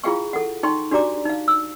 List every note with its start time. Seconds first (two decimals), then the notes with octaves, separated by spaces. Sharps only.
0.04 E4 F4 G#4 F5 G5 C#6
0.33 A4 F#5
0.63 D#4 G5 C6 C#6
0.91 D4 F#4 G4 D5 A#5 D6
1.25 D#4 F5
1.48 E6